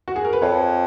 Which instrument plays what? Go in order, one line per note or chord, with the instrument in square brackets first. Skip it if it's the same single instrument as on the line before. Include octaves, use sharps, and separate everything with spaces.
[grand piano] F#4
G#4
A#4
B4
[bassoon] F2 [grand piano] C#5